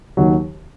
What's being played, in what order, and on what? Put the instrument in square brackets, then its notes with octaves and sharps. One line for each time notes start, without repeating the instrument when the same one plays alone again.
[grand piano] D#2 D#3 F#3